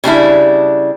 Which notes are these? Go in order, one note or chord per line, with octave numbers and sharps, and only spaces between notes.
C#3 G3 D4 E4